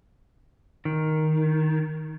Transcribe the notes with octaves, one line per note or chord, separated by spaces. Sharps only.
D#3